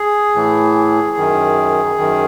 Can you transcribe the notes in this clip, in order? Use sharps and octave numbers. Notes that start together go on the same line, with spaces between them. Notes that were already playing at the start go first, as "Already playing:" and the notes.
Already playing: G#4
A2 E3
F#2 D#3
F#2 D#3